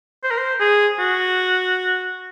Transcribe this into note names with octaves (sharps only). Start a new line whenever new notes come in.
C5
A#4
C5
G#4
F#4